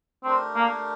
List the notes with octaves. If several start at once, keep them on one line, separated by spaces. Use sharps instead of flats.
A3 C4 D4 G4 A#4
A#3